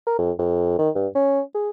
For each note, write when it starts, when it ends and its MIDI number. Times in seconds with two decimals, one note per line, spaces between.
0.07 0.17 70
0.18 0.31 41
0.39 0.78 41
0.78 0.90 51
0.95 1.07 43
1.15 1.41 61
1.55 1.70 68